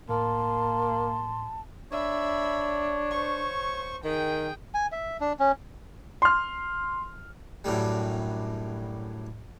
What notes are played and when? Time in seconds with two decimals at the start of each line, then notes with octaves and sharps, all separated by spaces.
0.09 A2 A#3 A5 C6
1.92 D4 C#5 E5 B5
3.11 C5 C#6
4.04 D#3 G#4 G5
4.74 G#5
4.92 E5
5.21 D4
5.40 C#4
6.22 C6 F6
7.64 F#2 A2 D3 G3